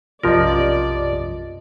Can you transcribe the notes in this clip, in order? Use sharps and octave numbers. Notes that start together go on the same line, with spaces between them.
B1 F#2 C3 F3 F4 A#4 D5 D#5